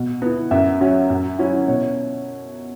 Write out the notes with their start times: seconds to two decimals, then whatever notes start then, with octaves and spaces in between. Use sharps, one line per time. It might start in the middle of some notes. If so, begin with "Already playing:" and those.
Already playing: B2
0.22 B3 E4
0.51 F#2 E5
0.81 F#3 C#4
1.10 F#2
1.38 F#3 C#4 E4
1.68 B2 C#5